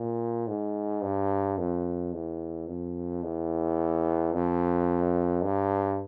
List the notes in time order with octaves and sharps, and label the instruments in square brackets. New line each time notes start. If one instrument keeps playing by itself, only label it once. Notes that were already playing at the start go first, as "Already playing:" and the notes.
Already playing: [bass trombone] A#2
G#2
G2
F2
E2
F2
E2
F2
G2